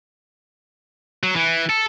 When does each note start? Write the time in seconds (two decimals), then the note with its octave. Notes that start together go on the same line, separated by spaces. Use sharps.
1.23 F#3
1.36 E3
1.70 A4